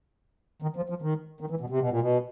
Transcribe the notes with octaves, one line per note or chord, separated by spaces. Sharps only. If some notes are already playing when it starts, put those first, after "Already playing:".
D#3
F3
F3
D#3
D#3
E3
B2
C3
B2
A#2
B2